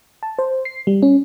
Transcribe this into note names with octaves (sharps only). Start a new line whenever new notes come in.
A5
C5
C7
G3
C#4